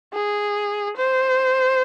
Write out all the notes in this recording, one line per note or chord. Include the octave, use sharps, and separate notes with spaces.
G#4
C5